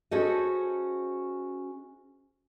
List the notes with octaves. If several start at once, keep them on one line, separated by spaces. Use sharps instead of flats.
C#4 F#4 G#4 A4 C5 D#5